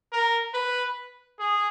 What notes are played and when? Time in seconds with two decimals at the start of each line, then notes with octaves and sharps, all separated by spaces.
0.12 A#4
0.54 B4
1.40 G#4